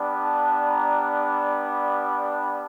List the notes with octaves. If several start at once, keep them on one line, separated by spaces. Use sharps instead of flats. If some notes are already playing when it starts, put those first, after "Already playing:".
Already playing: G3 B3 D4
A5
A#5